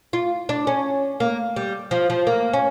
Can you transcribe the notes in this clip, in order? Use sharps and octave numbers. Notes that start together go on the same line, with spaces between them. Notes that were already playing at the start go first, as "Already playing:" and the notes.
F4
D4
C#4
A#3
G3
F3
F3
A#3
C#4